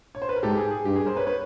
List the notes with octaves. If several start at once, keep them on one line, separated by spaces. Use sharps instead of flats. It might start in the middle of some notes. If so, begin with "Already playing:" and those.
C#5
C5
B4
A#4
G#2 G4 A4
G#4
G#4
G2 G4
G#4
A#4 C5
B4 C#5
B4 C#5